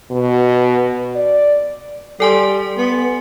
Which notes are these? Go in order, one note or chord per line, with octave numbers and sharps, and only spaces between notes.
B2
D5
G3 A4 G#5 C6
B3